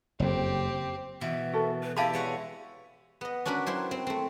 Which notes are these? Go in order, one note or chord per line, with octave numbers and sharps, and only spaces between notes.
F#1 F2 C4 G4
B2 E3 E5
F#4 A4 A#4
B4
E4 G4 G#4 D5 E5 F5 A5 B5
G#3 C#5 F#5
B3 D#5
C#4 D4 F#4 A#4 B4
F#3 E4 C5 G5
C4
A3 C4